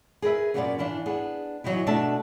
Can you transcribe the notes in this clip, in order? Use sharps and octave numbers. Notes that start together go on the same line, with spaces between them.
G#4 A#4 B4 E5
F#2 A#2 A#3 B3 C#4 D5
E3 D4 E4 F5
B3 D4 G#4
E3 F#3 B3 D#4 E4
B2 A3 D4 D5 E5 A5